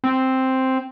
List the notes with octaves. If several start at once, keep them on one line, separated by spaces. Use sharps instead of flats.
C4